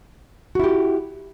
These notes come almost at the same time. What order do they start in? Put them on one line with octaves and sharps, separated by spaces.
F#4 E4 G4